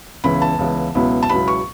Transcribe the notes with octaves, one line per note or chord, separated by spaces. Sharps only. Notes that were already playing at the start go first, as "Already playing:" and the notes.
C#2 C#3 E3 B3 B5
A5
C#2 C#3 E3 B3
C#2 B2 F#3 B3 E4
A5
C#2 B2 F#3 B3 E4 B5
C#6